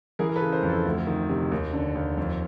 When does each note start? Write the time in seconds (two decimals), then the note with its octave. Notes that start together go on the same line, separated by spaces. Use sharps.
0.19 E3 G#4 A#4
0.29 A#4
0.36 A4 B4
0.41 C#3
0.52 A#4 C5
0.63 F2
0.69 A4
0.85 D2
1.07 D#3
1.29 C3
1.52 D#2
1.73 D3
1.95 D#2
2.17 F2